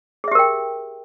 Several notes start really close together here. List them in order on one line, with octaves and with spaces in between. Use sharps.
G#4 E5 G4 A#4 G5